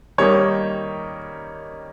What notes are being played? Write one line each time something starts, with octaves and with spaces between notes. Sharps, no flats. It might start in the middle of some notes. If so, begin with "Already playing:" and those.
D#3 G3 A#3 D#4 C#5